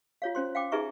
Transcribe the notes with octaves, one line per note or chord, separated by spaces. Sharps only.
F4 C#5 F5
C#4 C5 C6
F5 G5 D6
D#4 G#4 B4 E5 A#5 C#6